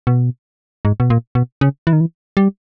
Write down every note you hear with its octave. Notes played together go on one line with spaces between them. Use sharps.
B2
G#2
B2
A#2
B2
C#3
E3
D#3
E3
G3